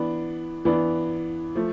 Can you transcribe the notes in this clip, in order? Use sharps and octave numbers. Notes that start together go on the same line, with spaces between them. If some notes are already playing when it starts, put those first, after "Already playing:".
Already playing: E3 B3 D4
E3 B3 D4
F3 A3